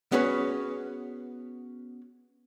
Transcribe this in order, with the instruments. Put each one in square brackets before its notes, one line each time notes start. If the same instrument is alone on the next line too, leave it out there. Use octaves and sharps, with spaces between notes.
[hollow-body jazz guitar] B3 C#4 F#4 G#4 B4 C#5